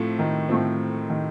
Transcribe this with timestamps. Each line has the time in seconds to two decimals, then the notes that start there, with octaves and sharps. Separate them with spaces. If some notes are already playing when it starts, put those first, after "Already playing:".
Already playing: A2 F3 A3 C4
0.19 D#3
0.49 A2 F3 A3 C4
1.10 D#3